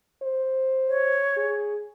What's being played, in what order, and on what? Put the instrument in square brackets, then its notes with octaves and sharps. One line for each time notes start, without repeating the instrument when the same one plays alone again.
[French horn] C5
[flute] C#5
[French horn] G#4